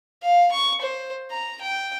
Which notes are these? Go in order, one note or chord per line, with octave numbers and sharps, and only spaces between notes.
F5
C#6
C5
A#5
G5